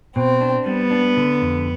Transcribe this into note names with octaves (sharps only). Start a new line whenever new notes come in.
B2 C4
D4
G3 B3
D4
D3
F2